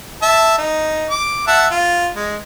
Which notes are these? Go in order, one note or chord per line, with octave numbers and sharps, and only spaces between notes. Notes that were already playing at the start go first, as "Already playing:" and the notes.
E5 A5
D#4
D6
E5 F#5 A5
F4
G#3